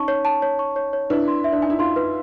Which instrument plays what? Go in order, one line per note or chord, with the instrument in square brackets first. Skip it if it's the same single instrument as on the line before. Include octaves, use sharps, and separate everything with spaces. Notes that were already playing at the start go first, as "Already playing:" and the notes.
Already playing: [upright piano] C#4 D#4 [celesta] A5 C#6
[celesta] C#5
A5
C#5
C#6
C#5
C#5
[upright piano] D4 E4 [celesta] B4
[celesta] C6
E5
[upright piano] D4
[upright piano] D#4 [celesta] G#5
[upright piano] E4
[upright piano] D#4 F4 [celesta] C6
[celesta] B4